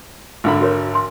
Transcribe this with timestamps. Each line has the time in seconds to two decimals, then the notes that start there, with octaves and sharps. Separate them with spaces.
0.44 G#1 D3 B5
0.61 F#4 A#4 C#5
0.94 G#5 C6